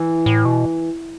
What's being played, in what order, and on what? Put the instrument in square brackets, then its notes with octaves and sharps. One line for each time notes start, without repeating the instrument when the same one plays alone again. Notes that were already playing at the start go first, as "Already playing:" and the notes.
Already playing: [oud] E3
[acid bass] A2
B2